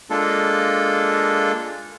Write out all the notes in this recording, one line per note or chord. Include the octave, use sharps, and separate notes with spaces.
G#3 A#3 D4 F4 A4